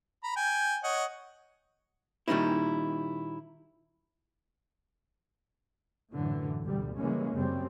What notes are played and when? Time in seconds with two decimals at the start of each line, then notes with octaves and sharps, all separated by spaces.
0.23 A#5 B5
0.36 G5 G#5
0.84 C#5 D#5 F#5
2.28 A#2 D#3 G3 C#4 D#4 E4
6.14 F#2 A2 D3 E3
6.63 D2 B2 G3
6.97 C#3 E3 G3 G#3 A#3 C#4
7.33 F#2 C#3 G3 C4